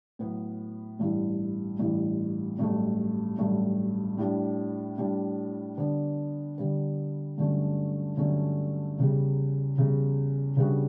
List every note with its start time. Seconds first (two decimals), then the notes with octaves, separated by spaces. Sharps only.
0.19 A2 F#3 B3
0.99 A1 G2 E3
1.79 A1 G2 E3
2.58 A1 G2 F#3 A3
3.38 A1 G2 F#3 A3
4.17 A2 G3 D4
4.98 A2 G3 D4
5.77 D3 G3 B3 D4
6.58 D3 G3 B3 D4
7.38 G2 D3 F#3 A3 C#4
8.17 G2 D3 F#3 A3 C#4
8.98 E2 C#3 G3
9.77 E2 C#3 G3
10.57 C#3 G3 B3 D4 F#4